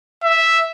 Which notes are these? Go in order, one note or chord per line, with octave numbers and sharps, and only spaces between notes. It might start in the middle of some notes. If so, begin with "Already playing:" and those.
E5